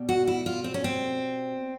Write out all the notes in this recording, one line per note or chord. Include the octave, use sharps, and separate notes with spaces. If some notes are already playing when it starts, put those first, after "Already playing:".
Already playing: B2 G3
F#4
E4
F4
C4
C#4
C4